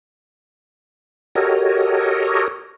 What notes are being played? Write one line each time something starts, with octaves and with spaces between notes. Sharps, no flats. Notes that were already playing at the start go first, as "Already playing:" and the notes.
F#4 G4 A4 A#4 C#5 D#5